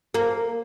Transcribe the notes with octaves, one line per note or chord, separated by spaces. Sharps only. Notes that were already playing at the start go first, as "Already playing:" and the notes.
A#3